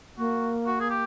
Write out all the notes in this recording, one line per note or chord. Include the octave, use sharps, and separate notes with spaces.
A#3 F#4
F#4
G#4
G4